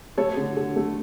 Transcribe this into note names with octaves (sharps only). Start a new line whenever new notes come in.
A3 A4 C#5
D3
D3
A3